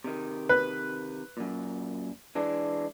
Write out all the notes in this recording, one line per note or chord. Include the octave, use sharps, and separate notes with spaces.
C3 D#3
B4
F#2 A#2
E3 G#3 D4